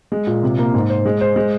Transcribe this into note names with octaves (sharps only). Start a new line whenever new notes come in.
G#3
A#2
C3
A#3
G#2
C5
G#3
C5
G#3